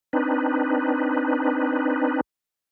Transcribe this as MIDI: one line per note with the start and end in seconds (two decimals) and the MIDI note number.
0.13 2.21 60
0.13 2.21 62
0.13 2.21 63
0.13 2.21 71